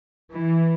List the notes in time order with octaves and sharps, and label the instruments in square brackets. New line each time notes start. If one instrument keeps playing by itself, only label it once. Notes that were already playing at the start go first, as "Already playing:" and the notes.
[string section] E3